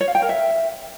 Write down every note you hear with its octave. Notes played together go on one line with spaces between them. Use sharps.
C#5
F5
G5
A#4
E5